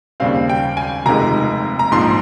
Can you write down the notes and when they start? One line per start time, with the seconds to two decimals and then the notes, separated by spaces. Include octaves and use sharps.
0.20 D#2 C#3 G3 C4 F5
0.49 G5
0.77 G#5
1.06 F1 F2 C3 D#3 G#3 A#5
1.79 A#5
1.91 A#1 G#2 F3 C4 C6